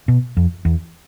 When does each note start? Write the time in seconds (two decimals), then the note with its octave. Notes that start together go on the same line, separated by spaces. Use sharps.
0.08 B2
0.37 F2
0.65 E2